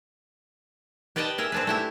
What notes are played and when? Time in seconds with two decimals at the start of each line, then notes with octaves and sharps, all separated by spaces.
1.16 G4 B4 D5 D#5 G5 A5
1.38 G#4 A#4 E5
1.52 C4 D4 B4
1.67 A3 E4 G4